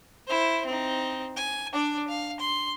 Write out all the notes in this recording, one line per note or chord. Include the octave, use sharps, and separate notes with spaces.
E4 C5
C4 D#4
G#5
D4 D5
F5
C6